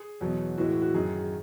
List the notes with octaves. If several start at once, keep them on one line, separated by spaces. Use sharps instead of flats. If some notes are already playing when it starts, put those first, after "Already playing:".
Already playing: G#4
E2 B2 F#3
A2 E3 G#3 F#4
F#4
F#2 D#3 F#3 G#4
G#4